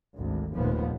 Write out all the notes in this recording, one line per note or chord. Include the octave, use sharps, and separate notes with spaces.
G#1 D2
F1 D#2 A#2 F3 B3